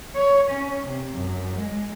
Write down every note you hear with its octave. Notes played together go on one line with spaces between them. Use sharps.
C#5
C#4
C3
F#2
G#3